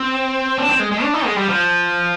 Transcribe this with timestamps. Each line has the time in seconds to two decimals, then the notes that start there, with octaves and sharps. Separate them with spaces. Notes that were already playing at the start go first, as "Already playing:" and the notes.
Already playing: C4
0.58 D4
0.69 C4
0.80 G#3
0.92 G#3
1.03 D4
1.14 D#4
1.26 G#3
1.36 G3
1.48 F3